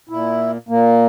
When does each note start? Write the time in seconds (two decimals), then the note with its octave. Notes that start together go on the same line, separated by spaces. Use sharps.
0.09 A#2 E4
0.69 A#2 A#3